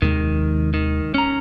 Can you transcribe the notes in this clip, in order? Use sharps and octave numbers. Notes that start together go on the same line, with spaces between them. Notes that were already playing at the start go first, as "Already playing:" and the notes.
D#2 C3 D#3 G#3
D#3
C#4 A#5